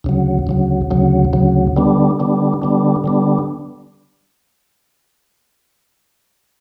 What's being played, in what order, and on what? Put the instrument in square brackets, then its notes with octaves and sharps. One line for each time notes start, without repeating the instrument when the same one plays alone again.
[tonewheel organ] D2 C#3 F#3
D2 C#3 F#3
D2 C#3 F#3
D2 C#3 F#3
D3 G3 B3 D4
D3 G3 B3 D4
D3 G3 B3 D4
D3 G3 B3 D4